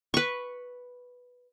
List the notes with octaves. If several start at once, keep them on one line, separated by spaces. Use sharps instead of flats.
B4 C#6